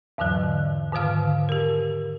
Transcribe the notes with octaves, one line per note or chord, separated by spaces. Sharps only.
E2 G#2 D3 E3 F#3
G#2 D3 D#3 B4 F5 F6
G4 A#4